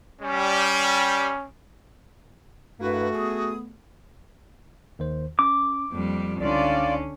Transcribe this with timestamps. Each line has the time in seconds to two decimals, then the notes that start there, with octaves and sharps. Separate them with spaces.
0.21 G3 C#4
2.80 G2 A3 A#3 E4 F#4 B4
3.14 B3 G#4 D#6
4.99 D#2 D#3 C5
5.39 C#4 D6
5.92 F2 G3 A#3
6.40 C#2 D3 C#4 D#4 F4 D5